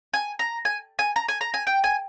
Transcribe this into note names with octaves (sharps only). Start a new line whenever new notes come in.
G#5
A#5
G#5
G#5
A#5
G#5
A#5
G#5
G5
G#5